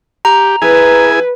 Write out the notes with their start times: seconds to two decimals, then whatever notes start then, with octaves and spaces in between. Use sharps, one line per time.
0.25 G4 A#5
0.62 E4 G#4 B4 G#5